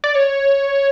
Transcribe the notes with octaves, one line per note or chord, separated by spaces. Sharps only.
D5
C#5